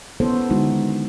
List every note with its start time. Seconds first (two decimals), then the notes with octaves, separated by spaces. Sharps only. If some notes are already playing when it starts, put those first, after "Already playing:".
0.20 B3 C#4 E4 A4 C5 C#5
0.50 D3 D#3 G#3 D#4 E4 F#4